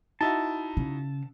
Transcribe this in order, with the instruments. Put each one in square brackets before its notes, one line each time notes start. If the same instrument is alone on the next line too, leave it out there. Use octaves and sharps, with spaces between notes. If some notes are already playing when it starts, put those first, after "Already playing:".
[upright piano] D#4 E4 F#4 [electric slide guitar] A5
[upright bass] C#3